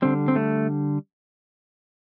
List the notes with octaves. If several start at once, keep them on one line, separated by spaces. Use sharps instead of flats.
D3 G3 C4
C4
A3